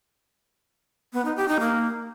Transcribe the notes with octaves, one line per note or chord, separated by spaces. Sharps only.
B3
D#4
G4
D#4
A#3